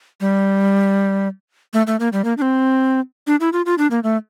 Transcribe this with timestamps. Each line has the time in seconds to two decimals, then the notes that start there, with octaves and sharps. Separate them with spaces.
0.21 G3
1.73 A3
1.87 A3
2.00 A#3
2.13 G3
2.24 A#3
2.38 D4
2.42 C4
3.27 D4
3.40 E4
3.53 F4
3.66 F4
3.78 D4
3.91 A#3
4.03 A3